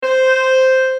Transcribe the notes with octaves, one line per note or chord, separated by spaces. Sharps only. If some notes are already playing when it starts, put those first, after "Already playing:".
C5